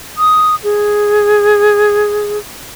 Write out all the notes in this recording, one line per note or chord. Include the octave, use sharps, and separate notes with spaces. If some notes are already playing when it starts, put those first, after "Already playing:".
D#6
G#4